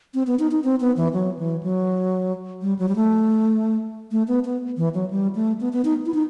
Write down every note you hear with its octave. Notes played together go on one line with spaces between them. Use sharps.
C4
B3
D#4
D#4
C4
B3
E3
F#3
E3
F#3
G3
F#3
G3
A3
A3
B3
B3
E3
F#3
G3
A3
B3
B3
D#4
E4
D#4